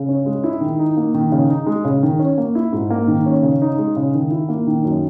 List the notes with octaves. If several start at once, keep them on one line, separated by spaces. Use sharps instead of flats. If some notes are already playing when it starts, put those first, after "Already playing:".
Already playing: C#3
C#4
G#3
E4
D#3
D#4
A#3
D#3
C#3
D#4
G#3
C#3
D#3
C#4
A#3
E4
G#2
A#3
D#3
C#4
C#3
D#4
G#3
C#3
D#3
E4
A#3
D#3
F#2